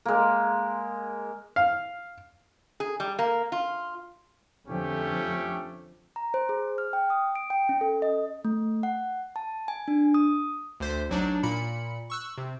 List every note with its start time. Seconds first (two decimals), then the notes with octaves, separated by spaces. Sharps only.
0.05 G#3 A#3
1.56 F5
2.80 G#4
3.00 G3
3.19 A#3
3.52 F4
4.68 F2 D3 F3 A3 C#4 G4
6.16 A#5
6.34 C5
6.49 G#4
6.78 F6
6.93 G5
7.10 D#6
7.36 D7
7.50 G5
7.69 C#4
7.81 A4
8.02 D#5
8.45 A3
8.83 F#5
9.36 A5
9.68 G#5
9.88 D4
10.14 D#6
10.80 D2 C5 B6
11.09 A1 F#3 D4 D#4
11.43 A#2 B5 C#7
12.10 C#6 E6 F#6
12.37 C3